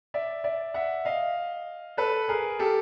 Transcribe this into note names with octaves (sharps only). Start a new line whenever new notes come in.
D5 E5
D5 E5
E5 F#5
D#5 F5
A4 B4
G#4 A#4
G4 A4